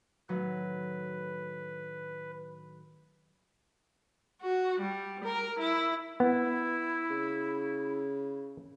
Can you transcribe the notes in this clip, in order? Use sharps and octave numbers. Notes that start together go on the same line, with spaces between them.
A2 D#3 F#3 B4
F#4
G3
A#4
E4
B3 E4
C#3